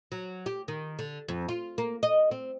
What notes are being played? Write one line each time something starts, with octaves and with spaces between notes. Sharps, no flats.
F#3
G4
D#3
D3
F2
F4
A#3
D#5
C4